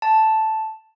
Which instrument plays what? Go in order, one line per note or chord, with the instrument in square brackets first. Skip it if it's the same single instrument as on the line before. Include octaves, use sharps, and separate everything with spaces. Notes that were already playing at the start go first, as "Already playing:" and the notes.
[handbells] A5